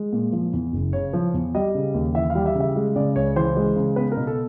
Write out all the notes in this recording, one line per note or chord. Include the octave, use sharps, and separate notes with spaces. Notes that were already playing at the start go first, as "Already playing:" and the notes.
Already playing: G#3
A#2
F3
E2
F#1
C#3 C#5
F3
E2
G3 D#5
C#3
D#2
E3 E5
F5
G3
E5
C#3
E5
G#3
C#3 D5
C#2 C#5
E3 C5
G#3
C#3
B3 B4
A#4
B2
A4